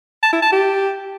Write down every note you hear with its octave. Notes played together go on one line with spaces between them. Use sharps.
A5
E4
A5
G4